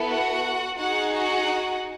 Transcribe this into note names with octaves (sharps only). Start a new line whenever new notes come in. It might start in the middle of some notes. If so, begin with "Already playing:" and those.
Already playing: B3 E4 A4
F#4 F#5
D#4 F#4 G#4 F#5
F#4 F#5